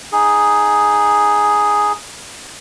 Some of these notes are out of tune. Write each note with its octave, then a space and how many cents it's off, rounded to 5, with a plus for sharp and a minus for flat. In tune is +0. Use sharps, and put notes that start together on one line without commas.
D#4 +0 G#4 +0